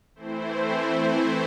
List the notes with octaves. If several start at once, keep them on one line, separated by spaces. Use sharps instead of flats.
E3 A3 C4 E4 C5